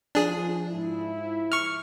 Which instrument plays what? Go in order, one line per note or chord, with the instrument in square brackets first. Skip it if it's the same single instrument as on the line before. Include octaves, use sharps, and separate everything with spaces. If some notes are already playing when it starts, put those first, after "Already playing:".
[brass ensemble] F3 [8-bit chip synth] D4 G#4
[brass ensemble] G#2 F3 E4
[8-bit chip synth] C#6 F6